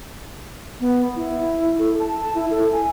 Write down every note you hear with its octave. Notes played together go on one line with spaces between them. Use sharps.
B3
E4
A4
A5
E4
A4
G#5